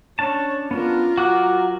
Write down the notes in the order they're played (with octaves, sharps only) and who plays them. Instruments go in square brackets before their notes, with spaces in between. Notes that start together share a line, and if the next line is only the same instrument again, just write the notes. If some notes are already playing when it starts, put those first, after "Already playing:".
[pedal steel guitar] C#4 D4 A5 [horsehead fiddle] C#5
[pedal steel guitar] B3 C#4 D4 [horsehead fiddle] F4 A#4
[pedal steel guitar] F#3 D6 F#6 [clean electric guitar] F#4